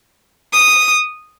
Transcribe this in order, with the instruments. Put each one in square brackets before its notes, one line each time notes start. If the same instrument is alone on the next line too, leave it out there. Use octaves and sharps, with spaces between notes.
[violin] D#6